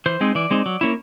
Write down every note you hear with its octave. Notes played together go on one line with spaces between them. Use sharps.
E3 C5
G#3 C4 D#4
E3 D5
G#3 C4 D#4
F#3
A#3 C#4 E4